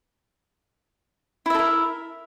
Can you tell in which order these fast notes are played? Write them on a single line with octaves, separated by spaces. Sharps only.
E4 E5 A4 A#4